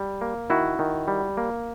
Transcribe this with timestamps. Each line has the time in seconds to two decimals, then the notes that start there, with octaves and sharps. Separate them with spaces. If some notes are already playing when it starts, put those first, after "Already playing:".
Already playing: G3
0.21 A#3
0.50 D#3 E4 F#4
0.79 D#3
1.08 G3
1.37 A#3